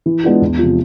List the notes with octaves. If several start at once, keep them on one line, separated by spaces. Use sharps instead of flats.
E3
G#3 B3 D4 F4
E2
C3 F3